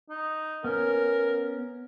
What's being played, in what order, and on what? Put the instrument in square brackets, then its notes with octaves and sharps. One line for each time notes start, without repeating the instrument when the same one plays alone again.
[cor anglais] D#4
[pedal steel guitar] B3 C#4 [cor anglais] A#4